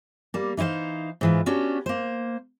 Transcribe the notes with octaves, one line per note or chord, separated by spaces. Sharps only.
G3 A#3
E3 D#4 E4 C5 F5
G#2 E3 F4
B3 C#4 D4 F#4 G4
A#3 C5